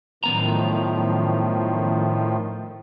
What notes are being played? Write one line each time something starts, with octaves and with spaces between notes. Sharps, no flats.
F#2 A2 D#3 F3 B3 A#5